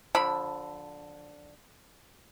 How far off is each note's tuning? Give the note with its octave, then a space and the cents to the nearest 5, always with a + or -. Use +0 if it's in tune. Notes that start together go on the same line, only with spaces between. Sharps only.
D3 +0 F3 +25 B5 +0